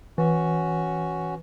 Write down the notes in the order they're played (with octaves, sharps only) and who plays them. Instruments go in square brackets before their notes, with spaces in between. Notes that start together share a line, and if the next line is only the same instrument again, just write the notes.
[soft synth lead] E3 [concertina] C#4 F#4